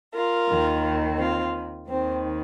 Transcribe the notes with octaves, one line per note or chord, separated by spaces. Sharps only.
F4 A#4
D#2 D#3
C4 F4
D#2 D#3 C4